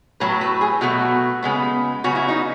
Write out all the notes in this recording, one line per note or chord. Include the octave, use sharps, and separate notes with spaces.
A2 F#3 A3 B4
B4
G#4
B2 F#3 A3 F#4
C#3 G#3 B3
C#3 F#3 B3 F#4
E4
D#4